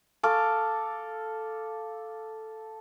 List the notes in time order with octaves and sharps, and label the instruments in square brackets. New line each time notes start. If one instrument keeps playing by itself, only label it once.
[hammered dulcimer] A4 F5 D6